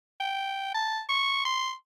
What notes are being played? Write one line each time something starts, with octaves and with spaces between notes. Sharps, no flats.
G5
A5
C#6
C6